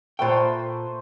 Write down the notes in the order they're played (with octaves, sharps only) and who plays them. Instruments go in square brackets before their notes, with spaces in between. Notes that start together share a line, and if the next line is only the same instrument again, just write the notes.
[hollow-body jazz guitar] A#2 G5 [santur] A3 B4 C5